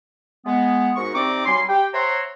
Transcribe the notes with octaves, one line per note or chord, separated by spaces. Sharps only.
G#3 B3
G#2 F#4 A#4 C#6
C3 C4 D#4 D5 D6
F#3 G3 G#5 C6
G4 G5
C5 C#5 E5 F#5 A#5 C6